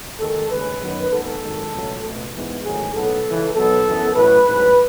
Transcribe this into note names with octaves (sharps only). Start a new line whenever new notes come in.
D#2 D#3 G#3 A4
D#2 C#3 G#3 B4
F#2 D#3 F#3 B3
D#2 D#3 G#3 B3 A4
G#1 F#2 D#3 G#3
C#2 B2 F#3 A3
C#2 B2 A3
G#2 E3 G#3 B3
A1 G#2 D#3 F#3 A3 G#4
B1 A2 F#3 B3 A4
C#2 C#3 E3
B1 B2 F#3 B3 A4
F#2 E3 B3
A1 A2 F#3 B4
A1 G#2 F#3